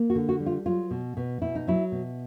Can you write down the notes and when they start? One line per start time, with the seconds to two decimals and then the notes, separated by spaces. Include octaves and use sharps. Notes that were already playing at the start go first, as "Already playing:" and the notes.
Already playing: A#3
0.10 F#4
0.15 D3
0.29 F#4
0.40 G3
0.46 F4
0.66 F#3 F4
0.91 B2
1.17 B2
1.42 B2 E4
1.55 D#4
1.67 F#3 E4
1.92 B2